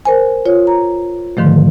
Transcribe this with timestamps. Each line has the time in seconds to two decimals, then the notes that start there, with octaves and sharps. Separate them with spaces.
0.05 A#4 C5 G#5
0.46 F4 C#5
0.67 A#5
1.37 G#2 D3 D#3 F3 A3